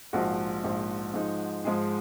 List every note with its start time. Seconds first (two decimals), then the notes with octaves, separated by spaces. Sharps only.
0.13 A#1 G#2 F3 F#4
0.64 A#1 G#2 F3
1.14 G#2 F3 G#3 D#4
1.64 G#2 F3 G#3 D#4 G#4